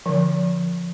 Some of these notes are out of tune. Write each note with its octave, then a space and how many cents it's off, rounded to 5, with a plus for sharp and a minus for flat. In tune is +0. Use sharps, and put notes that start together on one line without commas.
D3 -20 F3 +0